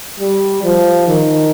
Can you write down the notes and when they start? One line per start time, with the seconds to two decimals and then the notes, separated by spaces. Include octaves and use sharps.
0.20 G3
0.64 F3
1.08 D#3